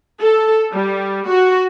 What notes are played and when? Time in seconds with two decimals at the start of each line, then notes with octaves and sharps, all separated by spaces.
0.20 A4
0.72 G3
1.30 F#4